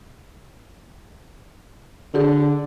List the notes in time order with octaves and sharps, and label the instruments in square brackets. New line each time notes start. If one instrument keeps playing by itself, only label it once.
[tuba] D3 [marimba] F#4 G#4 D5